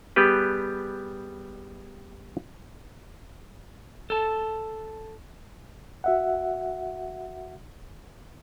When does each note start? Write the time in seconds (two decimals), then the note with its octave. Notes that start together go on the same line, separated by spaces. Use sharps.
0.16 G3 B3 G4 G#4 B4
4.10 A4 A5
6.04 F#4 E5 F#5